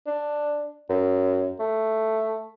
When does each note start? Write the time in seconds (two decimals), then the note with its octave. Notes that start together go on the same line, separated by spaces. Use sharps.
0.07 D4
0.89 F#2
1.60 A3